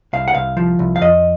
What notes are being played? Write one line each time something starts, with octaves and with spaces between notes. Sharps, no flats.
C2 F5
F#5
C2 F5
F3
C2
F5
F2 D#5